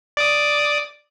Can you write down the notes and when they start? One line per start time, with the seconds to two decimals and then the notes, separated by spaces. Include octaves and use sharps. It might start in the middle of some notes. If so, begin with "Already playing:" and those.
0.17 D5 D6 D#6